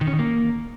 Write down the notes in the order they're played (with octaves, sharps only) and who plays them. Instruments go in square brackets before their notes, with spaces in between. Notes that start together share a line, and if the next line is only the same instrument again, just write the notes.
[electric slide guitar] D#3
C#4
D#3
A#3